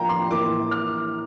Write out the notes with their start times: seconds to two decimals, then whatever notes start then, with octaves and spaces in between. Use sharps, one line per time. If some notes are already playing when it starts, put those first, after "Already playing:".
Already playing: A2 F3 A#3 D4 F5 G5 A#5
0.09 C6
0.31 A2 E3 A#3 E4 D6
0.71 F6